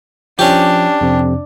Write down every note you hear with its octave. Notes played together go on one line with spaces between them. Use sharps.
F3 C#4 D4 G4
F2 C3 C4